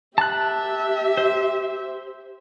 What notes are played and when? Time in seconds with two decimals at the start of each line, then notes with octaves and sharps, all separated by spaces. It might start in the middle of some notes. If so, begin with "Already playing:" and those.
0.18 G4 E5 A5 F#6
1.17 C5